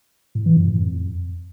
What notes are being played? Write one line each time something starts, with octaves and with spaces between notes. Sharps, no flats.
A2
E3
F#2
A2
F2